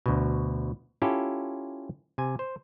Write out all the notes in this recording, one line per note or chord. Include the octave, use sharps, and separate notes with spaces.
D2 B2
C#4 E4 F4 G4 A4
C3 G#5
C5